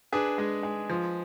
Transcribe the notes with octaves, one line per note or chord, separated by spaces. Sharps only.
D4 G#4 B4
G#3
G#3
F3